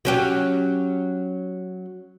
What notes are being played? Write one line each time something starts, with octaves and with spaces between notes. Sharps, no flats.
F#3 C#4 G4